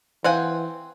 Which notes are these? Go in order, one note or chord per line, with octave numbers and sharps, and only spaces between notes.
E3 C4 C5 F5 F#5 G#5